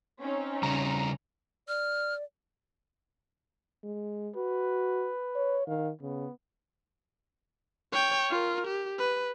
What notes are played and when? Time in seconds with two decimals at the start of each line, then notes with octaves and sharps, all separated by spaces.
0.21 C4 C#4 D#4
0.63 C#3 G3 A#5
1.68 D5 F6
3.84 G#3
4.36 F#4 B4
5.35 C#5
5.67 D#3 F5
6.01 C#3 B3
7.93 C#5 G5
8.30 F4 A#4
8.67 G4
8.99 B4